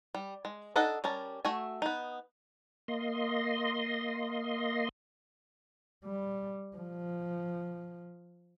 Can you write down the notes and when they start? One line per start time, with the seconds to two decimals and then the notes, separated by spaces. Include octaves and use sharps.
0.14 G3
0.45 G#3
0.76 D4 D#4 A4 D#5 F#5
1.04 G3 C#4 A#4 A5
1.45 A3 F#4 E5 G#5
1.82 B3 D#4
2.88 A#3 D#5 C6
6.05 G3
6.77 F3